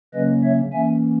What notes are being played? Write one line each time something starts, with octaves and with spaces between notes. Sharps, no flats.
C#3 F#3 A#3 C#4 B4 D#5
C#5 E5
E3 A#3 C#4 E5 G#5